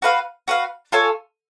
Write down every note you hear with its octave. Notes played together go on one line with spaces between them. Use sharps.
F#4 B4 F5
F#4 B4 F5
F4 A4 C#5 G#5